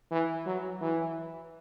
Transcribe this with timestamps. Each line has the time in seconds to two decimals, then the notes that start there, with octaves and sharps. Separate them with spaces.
0.11 E3
0.46 F#3
0.81 E3